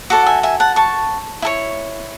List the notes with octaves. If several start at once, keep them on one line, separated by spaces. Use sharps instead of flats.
F#4 A4 D5 F#5
E5 G#5
E5 G#5
F#5 A5
A5 C#6
E4 A4 C#5